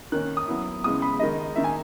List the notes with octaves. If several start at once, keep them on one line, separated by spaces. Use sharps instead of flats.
D#3 A#3 C#4 F#6
D#6
F#3 B3 E4
C#3 G#3 B3 E4 D#6
B5
D#3 G#3 D#4 D#5
D#3 A#3 D#4 E5
G#5